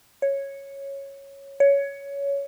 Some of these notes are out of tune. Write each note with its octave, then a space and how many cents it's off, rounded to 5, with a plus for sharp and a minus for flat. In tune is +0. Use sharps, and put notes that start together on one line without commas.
C#5 -5
C#5 +15